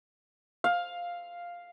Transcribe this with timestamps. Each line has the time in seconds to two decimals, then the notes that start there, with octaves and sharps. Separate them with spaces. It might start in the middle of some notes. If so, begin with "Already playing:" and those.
0.64 F5